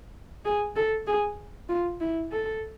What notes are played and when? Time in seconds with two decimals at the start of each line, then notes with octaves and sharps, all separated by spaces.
0.45 G#4
0.76 A4
1.06 G#4
1.69 F4
2.00 E4
2.31 A4